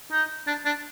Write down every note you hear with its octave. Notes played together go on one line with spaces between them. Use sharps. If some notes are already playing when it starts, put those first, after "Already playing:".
D#4
D4
D4